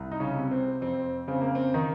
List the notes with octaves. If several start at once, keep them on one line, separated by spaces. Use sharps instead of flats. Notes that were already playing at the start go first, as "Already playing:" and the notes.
Already playing: C2
D#4
C#3 C#4
C3
C4
F2 C4
C#3 C4
A#3
C4
D#3 D#4